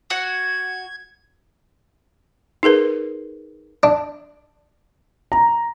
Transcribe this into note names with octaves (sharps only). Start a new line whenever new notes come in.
F#4 F#5 G#6
D#4 G#4 A#4 B4
D4
A#5